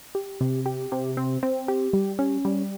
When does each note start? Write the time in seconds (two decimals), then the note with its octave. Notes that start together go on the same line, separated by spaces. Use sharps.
0.15 G4
0.41 C3
0.66 G4
0.92 C3
1.17 C4
1.43 C4
1.68 G4
1.93 G3
2.19 C#4
2.45 G3